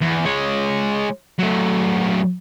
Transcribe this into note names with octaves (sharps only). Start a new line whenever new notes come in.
E2
G#3 C#5
F#3 A3